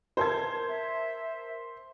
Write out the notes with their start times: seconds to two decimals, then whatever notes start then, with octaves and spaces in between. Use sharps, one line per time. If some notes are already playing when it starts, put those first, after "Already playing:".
0.17 A#4 C5 A5 G#6
0.68 E5